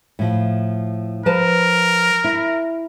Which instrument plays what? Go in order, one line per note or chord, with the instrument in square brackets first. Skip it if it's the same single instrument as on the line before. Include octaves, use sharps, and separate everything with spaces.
[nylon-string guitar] A2 F3
[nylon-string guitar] F3 B4 A5 [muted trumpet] A#4
[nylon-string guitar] E4